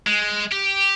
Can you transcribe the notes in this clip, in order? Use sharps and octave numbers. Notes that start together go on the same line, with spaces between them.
G#3
G4